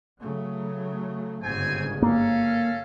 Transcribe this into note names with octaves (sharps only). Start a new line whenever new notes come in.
C#3 F#3 A3
G1 G#2 C#3 C4 G#5
A#3 C#4 A4 F5